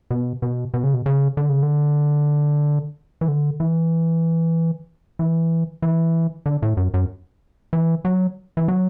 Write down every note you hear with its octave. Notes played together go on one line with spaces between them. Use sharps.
B2
B2
B2
C#3
B2
C#3
D3
C#3
D3
E3
D3
E3
E3
E3
D3
A2
F#2
F#2
E3
F#3
E3
F#3